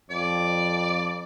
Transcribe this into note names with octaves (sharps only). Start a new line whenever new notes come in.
F2 D5